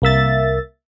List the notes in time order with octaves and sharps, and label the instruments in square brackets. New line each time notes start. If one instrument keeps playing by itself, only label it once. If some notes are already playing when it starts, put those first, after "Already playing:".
[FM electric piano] C2 A#3 E5 A6